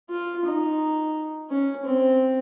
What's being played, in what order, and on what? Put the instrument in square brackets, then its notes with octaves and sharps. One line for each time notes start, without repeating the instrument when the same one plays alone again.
[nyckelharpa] F4
D#4
C#4
C4